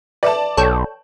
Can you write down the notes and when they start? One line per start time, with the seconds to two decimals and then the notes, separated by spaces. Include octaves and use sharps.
0.23 B4 D5 E5 A5
0.57 B1 A4 C#5 G5